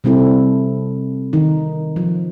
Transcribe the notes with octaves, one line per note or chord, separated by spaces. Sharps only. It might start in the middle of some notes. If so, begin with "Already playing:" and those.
C3 G3 C4 E4 A4
D#3 D#4
F3